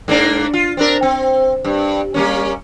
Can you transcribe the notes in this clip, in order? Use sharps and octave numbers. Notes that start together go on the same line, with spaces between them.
G#2 A#3 D4
F4
C4 D4 A#4
C4
G2
G3 A#3 C#4